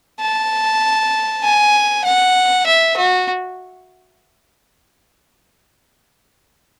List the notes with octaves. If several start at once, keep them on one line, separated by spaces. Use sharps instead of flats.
A5
G#5
F#5
E5
F#4